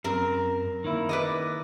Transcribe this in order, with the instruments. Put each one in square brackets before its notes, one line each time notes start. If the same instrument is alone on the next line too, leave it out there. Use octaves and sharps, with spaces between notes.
[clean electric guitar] F#2 [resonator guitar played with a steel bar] C4 A#4
[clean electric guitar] D#3 A#3 E4
[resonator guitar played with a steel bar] B4 D5 D#5